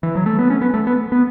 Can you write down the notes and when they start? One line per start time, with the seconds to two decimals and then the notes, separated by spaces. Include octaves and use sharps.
0.03 E3
0.15 F#3
0.26 A3
0.39 B3
0.50 C#4
0.61 B3
0.74 A3
0.87 B3
1.12 B3